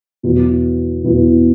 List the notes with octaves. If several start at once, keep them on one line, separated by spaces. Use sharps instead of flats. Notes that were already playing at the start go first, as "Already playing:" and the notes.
E2 B2 F#3 B3 E4
E2 B2 F#3 B3 E4